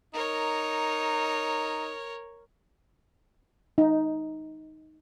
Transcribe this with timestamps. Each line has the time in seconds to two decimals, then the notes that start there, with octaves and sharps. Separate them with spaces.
0.14 D#4 A#4 C#5
3.78 D#4